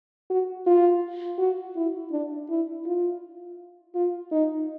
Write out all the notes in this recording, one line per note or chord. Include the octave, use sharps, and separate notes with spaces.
F#4
F4
F#4
E4
D4
E4
F4
F4
D#4